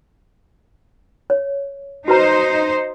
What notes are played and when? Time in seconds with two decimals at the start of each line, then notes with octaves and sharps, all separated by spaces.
1.30 C#5
2.08 D#4 F#4 B4 C5 A#5